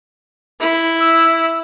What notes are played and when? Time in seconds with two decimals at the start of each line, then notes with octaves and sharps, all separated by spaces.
0.60 E4
1.00 E6